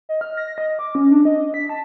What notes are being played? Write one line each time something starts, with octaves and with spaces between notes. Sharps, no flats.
D#5
F6
A#6
D#5
D6
C#4
D4
D#5
B6
A5